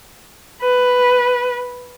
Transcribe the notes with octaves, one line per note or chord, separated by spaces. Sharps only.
B4